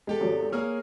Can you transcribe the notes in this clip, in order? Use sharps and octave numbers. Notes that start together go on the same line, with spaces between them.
E2 G#3 G4 A4
G#1 F#3
A#3 G#4 C#5 F6